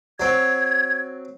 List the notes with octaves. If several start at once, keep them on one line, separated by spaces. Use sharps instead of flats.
F#3 C4 G#6